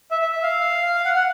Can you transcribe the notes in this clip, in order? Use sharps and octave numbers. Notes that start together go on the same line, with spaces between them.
E5
E5
E5
F5
F#5
F#5